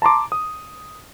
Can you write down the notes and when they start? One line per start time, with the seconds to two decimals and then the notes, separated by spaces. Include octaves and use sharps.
0.02 A5 A#5 C6 D6
0.32 D#6